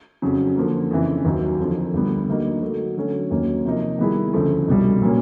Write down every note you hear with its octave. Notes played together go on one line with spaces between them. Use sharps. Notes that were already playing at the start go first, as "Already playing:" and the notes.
F2 C#3 F#3
D3 F3 A#3
F2 C#3 E3
D#2 D#3 F#3
F2 D3 F3
D2 D3 G3 B3
D3 F#3 A#3 D#4 F#4
D3 F#3 A3
D3 F#3 A3 C#4
D#2 D#3 F#3 A#3 C#4
C3 F3 A#3 D#4
D#3 G3 B3 E4 G#4
D2 C#3 F3 A3
C2 B2 G3
A#2 F#3 A#3 C#4